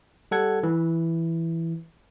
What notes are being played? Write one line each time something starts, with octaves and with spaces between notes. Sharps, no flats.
G3 A4 F#5 G#6
E3